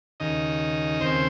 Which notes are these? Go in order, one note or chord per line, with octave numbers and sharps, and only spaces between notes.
D#2 C#3 D#4 D#5
D#2 C#3 C4 C5